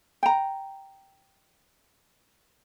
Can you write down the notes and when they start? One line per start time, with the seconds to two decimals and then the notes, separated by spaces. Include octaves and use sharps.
0.23 G5 A#5